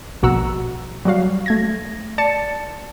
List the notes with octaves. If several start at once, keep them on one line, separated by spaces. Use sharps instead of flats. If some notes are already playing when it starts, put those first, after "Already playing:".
A#1 B2 F#4 F#5 A#5 E6
F#3 G3 F#4 F5
A3 G#6 A#6
D5 A5 A6 C#7